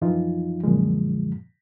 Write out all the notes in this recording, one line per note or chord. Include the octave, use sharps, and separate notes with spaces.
F#2 E3 F3 D#4 F4
F#2 A#2 D3 F3 G#3